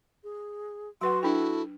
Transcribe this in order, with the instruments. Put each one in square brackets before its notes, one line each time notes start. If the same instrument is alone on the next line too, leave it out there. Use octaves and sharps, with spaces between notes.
[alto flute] G#4
[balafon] F#3 B4 F#5 [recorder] F#4 [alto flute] C6
[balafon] D4 G5 [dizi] E4 [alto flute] A4